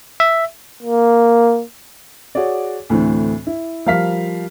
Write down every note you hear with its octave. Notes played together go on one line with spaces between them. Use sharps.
E5
A#3
F#4 G#4 C#5 D5
D2 A2 E3 C4
E4
F3 G3 A#4 F5 F6 B6